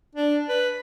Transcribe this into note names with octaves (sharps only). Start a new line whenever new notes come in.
D4
B4